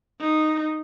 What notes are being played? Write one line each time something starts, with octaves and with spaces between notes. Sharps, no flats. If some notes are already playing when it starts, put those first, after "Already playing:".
D#4